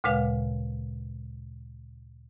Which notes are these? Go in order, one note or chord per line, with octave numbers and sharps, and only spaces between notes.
D2 A#2 C#3 G#3 B4 F5